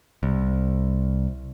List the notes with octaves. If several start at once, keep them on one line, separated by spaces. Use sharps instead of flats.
C2